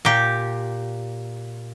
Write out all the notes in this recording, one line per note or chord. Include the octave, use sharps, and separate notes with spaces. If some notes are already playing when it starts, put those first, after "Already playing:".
A#2 G4